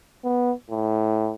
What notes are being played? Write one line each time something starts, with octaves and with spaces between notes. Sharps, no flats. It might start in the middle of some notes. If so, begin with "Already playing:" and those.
B3
A2